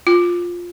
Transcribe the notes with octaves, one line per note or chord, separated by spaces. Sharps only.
F4